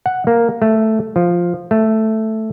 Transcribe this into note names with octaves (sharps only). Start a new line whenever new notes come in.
F#5
A#3
A3
F3
A3